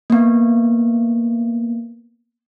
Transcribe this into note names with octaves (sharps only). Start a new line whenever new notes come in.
A#3 B3